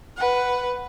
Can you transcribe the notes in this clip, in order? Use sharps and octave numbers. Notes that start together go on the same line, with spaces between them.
B4 F#5